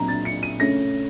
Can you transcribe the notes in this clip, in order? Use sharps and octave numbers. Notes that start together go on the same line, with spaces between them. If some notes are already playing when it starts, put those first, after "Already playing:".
Already playing: A#2 F#3 C4 A#5
A6
C#7
D#7
C#3 A3 C#4 A#6